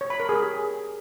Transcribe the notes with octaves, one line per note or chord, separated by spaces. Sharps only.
C#5
B5
A#4
G#4
G4